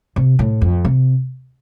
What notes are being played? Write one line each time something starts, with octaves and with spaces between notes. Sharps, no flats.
C3
A2
F2
C3